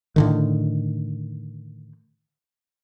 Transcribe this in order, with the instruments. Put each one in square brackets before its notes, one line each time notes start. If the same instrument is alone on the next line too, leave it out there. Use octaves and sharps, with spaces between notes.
[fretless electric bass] A2 D3 D#3